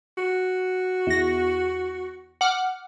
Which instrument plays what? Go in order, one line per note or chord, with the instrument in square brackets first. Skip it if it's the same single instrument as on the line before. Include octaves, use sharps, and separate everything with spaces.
[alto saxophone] F#4
[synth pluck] E2 A#6
F#5 D6 F6